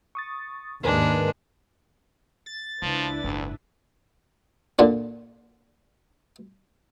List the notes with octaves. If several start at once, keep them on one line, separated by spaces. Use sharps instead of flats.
C#6 D#6 A6
D#2 G#2 G#3 D4 A#4 B4
A6
C#2 F3 D4 E4 B4
F#1 D2 G#2
A#2 D3 D4